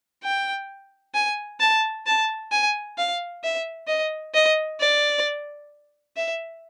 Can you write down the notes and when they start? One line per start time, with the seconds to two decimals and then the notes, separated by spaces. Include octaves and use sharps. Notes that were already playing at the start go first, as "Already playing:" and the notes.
0.24 G5
1.15 G#5
1.60 A5
2.06 A5
2.52 G#5
2.98 F5
3.43 E5
3.88 D#5
4.34 D#5
4.80 D5
6.16 E5